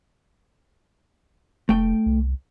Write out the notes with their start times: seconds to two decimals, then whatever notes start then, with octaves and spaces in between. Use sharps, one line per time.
1.69 F1 A3 G5
2.06 C2